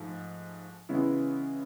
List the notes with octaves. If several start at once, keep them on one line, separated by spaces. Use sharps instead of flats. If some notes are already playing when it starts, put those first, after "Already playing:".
Already playing: G#2 F3 A3
C#3 E3 G#3 B3 E4